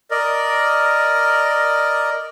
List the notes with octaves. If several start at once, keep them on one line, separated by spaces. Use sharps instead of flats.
A#4 D5 D#5